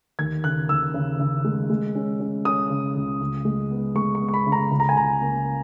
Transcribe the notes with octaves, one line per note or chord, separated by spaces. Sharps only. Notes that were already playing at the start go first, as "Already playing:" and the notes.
D#2 G#6
C#3 F#6
D#2 E6
C#3
C#3
G#3
G#3
C#4
C#4
C#4 D#6
C#3
C#2
C#2
G#3
B3
G#3 C#6
C#6
B3
C#6
B5
C#3
A#5
C#2 B5
A#5
G#5
C#2 A#5
A#3